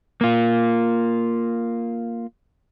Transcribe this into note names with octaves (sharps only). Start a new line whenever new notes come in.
A#3 F4